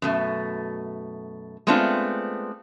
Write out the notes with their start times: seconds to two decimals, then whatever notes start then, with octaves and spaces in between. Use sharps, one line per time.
0.02 F#2 B2 A3
1.67 G#3 A3 B3 C4 D4 F4